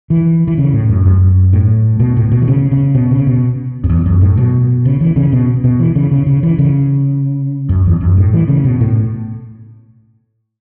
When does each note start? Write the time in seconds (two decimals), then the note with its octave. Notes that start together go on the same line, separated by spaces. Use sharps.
0.10 E3
0.48 E3
0.58 C#3
0.73 A2
0.89 F#2
1.06 F#2
1.53 A2
2.00 B2
2.17 A2
2.32 B2
2.41 E3
2.48 C#3
2.71 C#3
2.95 B2
3.11 C#3
3.27 B2
3.84 F#2
3.90 E2
4.06 F#2
4.21 A2
4.38 B2
4.85 C#3
5.01 E3
5.16 C#3
5.32 B2
5.64 B2
5.80 E3
5.96 C#3
6.11 C#3
6.27 C#3
6.43 E3
6.58 C#3
7.69 F#2
7.86 E2
8.01 F#2
8.17 A2
8.33 E3
8.48 C#3
8.64 B2
8.81 A2